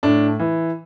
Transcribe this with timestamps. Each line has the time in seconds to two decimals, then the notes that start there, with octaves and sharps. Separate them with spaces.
0.03 A2 D4
0.39 E3